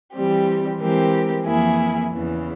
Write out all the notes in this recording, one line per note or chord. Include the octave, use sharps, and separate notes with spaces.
E3 G3 C4 G4
E3 G#3 C4 G4 A#4
F2 E3 A#3 E4 G#4
E2 C#3 E3